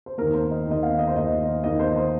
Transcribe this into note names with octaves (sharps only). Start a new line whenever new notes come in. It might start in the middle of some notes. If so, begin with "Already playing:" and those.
C5
D#2 D#3 A#3 A#4
C5
D#5
D#2 D#3 A#3 D#5
F5
D#5
C5
D#2 D#3 A#3 D#5
D#2 D#3 A#3 D#5
C5
C5